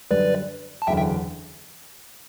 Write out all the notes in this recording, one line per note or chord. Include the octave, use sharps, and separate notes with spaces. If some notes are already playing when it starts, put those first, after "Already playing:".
F#2 D3 G3 B4 D5
A5
F#1 E2 D3 E5 G5
E5 G5